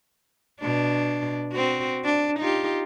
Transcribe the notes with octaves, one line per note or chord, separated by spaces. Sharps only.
B2 D4
C4 F#4
D4
D#4 F4 G4